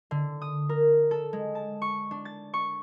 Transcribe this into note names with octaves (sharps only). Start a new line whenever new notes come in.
D3
D#6
A#4
A4
G#3
A5
C#6
D4
A6
C#6